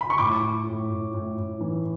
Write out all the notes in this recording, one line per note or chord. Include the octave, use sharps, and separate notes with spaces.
B5
C#6
A2 D6
A2
A2
A2
A2
A2
E3